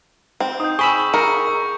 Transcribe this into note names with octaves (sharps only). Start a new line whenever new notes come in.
C4
D#4 D#6 G6
G#4 B5 C#6 E6
A#4 C#7